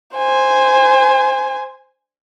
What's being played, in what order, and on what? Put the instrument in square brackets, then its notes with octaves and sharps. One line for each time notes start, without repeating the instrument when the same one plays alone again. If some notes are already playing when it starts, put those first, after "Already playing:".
[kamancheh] C5 G#5